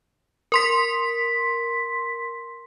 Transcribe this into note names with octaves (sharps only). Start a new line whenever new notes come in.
A#4 C6 B6